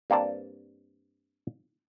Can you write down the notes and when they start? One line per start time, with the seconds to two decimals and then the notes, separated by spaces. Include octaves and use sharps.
0.10 G2 A#3 C4 D5 A5